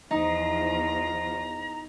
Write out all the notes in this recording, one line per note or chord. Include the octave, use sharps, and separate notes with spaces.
E2 F3 D#4 A#5